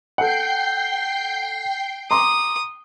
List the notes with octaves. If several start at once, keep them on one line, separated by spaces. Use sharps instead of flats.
A4 F#5 G5 G6 C7
A#5 C6 D6 D#6